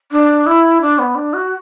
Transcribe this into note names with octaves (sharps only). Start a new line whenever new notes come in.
D4
E4
D4
B3
D4
F#4